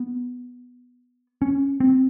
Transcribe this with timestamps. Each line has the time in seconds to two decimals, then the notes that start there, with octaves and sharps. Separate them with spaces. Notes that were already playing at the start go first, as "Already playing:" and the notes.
Already playing: B3
1.42 C#4
1.80 C4